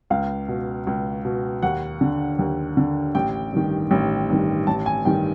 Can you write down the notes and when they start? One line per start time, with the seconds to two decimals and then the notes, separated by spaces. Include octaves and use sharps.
0.10 C#2 F5
0.48 B2
0.87 C#2
1.25 B2
1.62 D#2 F#5
2.01 D3
2.39 D#2
2.77 D3
3.15 A1 G5
3.53 G2 D#3
3.91 A1
4.29 G2 D#3
4.67 A1 A5
4.86 G#5
5.05 G2 D#3 G5